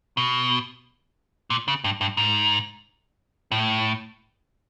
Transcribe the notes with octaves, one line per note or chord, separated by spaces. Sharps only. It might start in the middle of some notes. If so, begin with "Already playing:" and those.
B2
A#2
C#3
G2
G2
G#2
A2